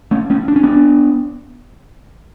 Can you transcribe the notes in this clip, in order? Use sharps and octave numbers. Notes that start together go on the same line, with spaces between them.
A3 C#4
A3 C#4
D4
C#4
B3 D4